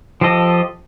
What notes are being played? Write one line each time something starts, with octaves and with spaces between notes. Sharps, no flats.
F3 G4 A4 D#5